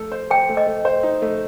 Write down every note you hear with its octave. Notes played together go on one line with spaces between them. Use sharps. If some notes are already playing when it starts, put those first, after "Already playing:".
Already playing: A3 A4
C5
C5 G5
A3
D#5
A3
C5
D#4
A3